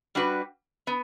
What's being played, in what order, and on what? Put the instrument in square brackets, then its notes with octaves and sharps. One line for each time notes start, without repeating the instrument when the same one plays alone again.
[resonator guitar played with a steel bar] G3 D4 F#4 B4
B3